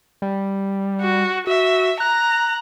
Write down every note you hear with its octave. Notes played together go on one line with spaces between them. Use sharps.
G3
F#4
F#4 E5
A#5 F#6